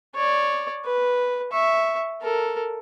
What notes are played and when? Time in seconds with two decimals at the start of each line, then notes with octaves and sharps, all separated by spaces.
0.15 C#5 D5
0.85 B4
1.52 E5 C#6
2.22 A4 A#4